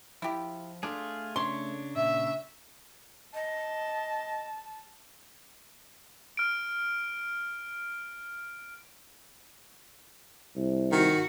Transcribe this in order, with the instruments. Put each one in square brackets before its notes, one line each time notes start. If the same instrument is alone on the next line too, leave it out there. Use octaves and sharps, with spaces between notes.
[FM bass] F3 [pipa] E4 G4
[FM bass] A3 [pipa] D4 [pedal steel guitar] F4 G#4
[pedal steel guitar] C#3 D4 C#5 [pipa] C6
[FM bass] A#2 [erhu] E5
[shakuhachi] D#5 [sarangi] A5
[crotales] F6 D7
[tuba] C2
[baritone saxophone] D#3 [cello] F#4